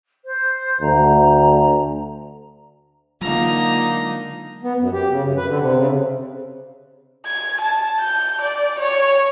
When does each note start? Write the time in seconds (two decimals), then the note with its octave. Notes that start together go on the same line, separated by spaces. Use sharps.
0.25 C5
0.81 D2 A#5
3.21 D3 F#3 G#3 A#3 D#4 F4 F5 A#5
4.63 B3
4.80 F#2
4.93 G4
5.10 C#3
5.24 F#2
5.37 B4
5.48 D3
5.60 C3
5.76 C#3
7.26 G#6
7.61 A5
8.00 G6
8.42 D5
8.80 C#5